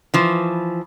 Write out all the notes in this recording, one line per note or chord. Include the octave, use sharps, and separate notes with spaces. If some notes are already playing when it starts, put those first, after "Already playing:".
E3 F3